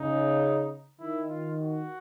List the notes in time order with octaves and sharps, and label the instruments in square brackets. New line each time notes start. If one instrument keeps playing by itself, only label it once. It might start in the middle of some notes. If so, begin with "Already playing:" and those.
Already playing: [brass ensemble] C#3 [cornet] D#4
[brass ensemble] D#3 [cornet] E4
[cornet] F4
F#4